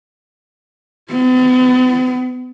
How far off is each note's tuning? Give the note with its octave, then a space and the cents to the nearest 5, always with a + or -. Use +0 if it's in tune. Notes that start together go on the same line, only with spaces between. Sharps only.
B3 +45